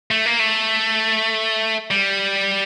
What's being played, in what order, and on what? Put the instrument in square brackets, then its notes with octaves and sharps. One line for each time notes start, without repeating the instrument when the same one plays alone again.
[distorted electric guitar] A3
A#3
A3
G3